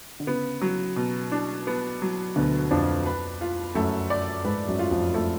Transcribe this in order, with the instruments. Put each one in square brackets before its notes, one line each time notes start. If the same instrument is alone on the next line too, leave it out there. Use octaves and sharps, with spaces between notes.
[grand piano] D3
[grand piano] C#3 [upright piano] B3
[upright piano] F#3
B2
D4
B3
F#3
[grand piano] D2 D3 [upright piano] B2
[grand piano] F2 F3 [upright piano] D4
[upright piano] B4
F4
[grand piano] F#2 F#3 [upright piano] A3
[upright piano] D5
[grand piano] G#2 G#3 [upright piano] B4
[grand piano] F#2 F#3
[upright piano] F4
[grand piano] F2 F3
[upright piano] A3